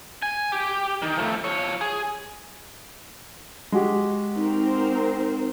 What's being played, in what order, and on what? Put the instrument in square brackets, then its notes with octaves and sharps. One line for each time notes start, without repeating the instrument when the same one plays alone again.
[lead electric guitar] G#5
G4
D#3
F3 A3
F3 C#5
G#4
[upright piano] G#3 F#4 G4
[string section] C4 A#4 C5 [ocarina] D#4